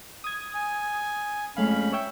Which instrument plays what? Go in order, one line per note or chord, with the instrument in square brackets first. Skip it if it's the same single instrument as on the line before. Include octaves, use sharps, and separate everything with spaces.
[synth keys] D#6 G#6
[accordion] G#5
[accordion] F2 C#4 B5 [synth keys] G#3 A3 F5
[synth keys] C#5 E5 G5